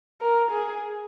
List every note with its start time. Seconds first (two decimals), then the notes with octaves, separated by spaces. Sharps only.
0.21 A#4
0.51 G#4